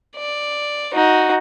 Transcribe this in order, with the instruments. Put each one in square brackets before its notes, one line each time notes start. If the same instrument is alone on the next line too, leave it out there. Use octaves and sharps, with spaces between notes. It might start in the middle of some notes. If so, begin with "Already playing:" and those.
[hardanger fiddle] D5
D#4 F#4